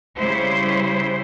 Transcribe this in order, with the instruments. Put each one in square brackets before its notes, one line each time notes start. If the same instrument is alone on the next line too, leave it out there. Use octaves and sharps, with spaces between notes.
[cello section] C#3 G3 E4 C5